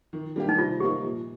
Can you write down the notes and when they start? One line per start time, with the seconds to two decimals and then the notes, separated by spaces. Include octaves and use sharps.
0.13 D#3
0.36 G3 A#3 D4 G4
0.49 D#4
0.58 C3 F4
0.80 F3 A#3 D#4 G4
1.04 A#2